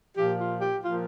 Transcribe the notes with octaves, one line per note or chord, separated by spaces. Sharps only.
A#2 F3 G4
F4
G4
A#2 F3 F4